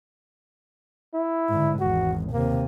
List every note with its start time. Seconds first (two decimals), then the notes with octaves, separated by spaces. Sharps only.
1.14 E4
1.49 G#2 D3
1.80 G#1 E2 F#4
2.33 D#2 C3 A#3